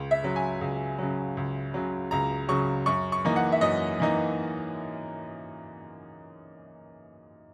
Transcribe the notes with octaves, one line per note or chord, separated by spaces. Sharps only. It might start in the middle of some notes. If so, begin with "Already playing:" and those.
Already playing: C#2
E5
C#3 F#3
G#5
C#2
C#3 F#3
C#2
C#3 F#3
C#2 A#5
C#3 F#3 C#6
F#2 C#6
C#6
E3 A#3 D#4
F#5
E5
F#2 D#5
E3 A#3 D#4